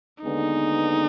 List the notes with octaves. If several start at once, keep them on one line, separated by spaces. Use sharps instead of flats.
D#2 D3 G#3 B3 D#4